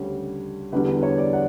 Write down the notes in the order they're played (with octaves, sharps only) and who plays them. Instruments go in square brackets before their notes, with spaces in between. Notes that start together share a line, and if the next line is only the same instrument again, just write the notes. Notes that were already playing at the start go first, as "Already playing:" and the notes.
Already playing: [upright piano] D2 C#3 G3 C#5
E2 D3 G3 B4
C#5
D5
F#5